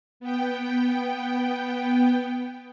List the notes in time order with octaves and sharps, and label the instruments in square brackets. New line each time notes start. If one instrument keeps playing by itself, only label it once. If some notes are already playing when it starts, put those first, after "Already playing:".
[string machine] B3 G5